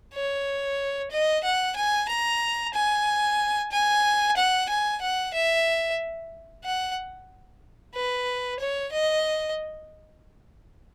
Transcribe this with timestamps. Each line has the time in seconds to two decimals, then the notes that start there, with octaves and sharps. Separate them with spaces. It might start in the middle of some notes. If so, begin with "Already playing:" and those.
0.14 C#5
1.12 D#5
1.44 F#5
1.76 G#5
2.09 A#5
2.74 G#5
3.72 G#5
4.37 F#5
4.70 G#5
5.02 F#5
5.34 E5
6.65 F#5
7.95 B4
8.60 C#5
8.93 D#5